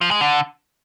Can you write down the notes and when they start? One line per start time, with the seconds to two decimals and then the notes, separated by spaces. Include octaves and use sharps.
0.01 F3
0.11 G#3
0.21 D3